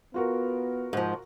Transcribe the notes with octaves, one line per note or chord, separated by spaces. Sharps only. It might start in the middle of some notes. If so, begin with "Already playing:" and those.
B3 F4 F#4 A#4
G#2 F3